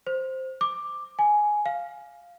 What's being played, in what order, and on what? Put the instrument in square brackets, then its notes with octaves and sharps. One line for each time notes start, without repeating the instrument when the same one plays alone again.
[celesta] C5
D6
G#5
F5